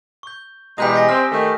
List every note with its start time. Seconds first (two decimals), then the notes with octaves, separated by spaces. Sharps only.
0.23 C#6 G6
0.78 B2 E3 G3 G#3 A#5 D#6 G6 B6
0.94 G#5 C#6 A#6
1.09 C4 F6
1.31 D#3 A3